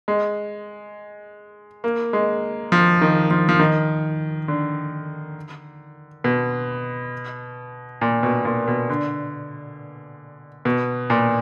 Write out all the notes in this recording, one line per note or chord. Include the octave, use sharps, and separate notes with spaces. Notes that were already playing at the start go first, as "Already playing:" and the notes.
G#3
A#3
G#3
F3
D#3
F3
F3
D#3
D3
B2
A#2
B2
A#2
B2
D3
B2
A#2